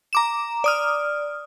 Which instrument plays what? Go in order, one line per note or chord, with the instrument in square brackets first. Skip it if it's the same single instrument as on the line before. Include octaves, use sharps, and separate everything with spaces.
[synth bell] A#5 D6 E7
D5 D#6 F6